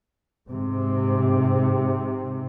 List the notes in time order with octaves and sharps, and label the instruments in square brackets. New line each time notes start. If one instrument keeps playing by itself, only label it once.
[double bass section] G#2 C3